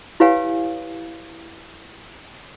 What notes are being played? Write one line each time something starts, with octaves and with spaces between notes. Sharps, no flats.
E4 G4 B4 C#5 F5 G#5